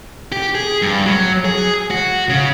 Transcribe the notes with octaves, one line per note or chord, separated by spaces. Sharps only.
G4
G#4
G2
F#3
G#4
F#4
C#3